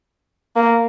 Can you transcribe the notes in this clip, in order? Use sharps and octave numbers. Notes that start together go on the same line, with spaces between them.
A#3